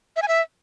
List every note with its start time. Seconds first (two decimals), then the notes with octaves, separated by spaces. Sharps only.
0.16 E5
0.22 G#5
0.28 E5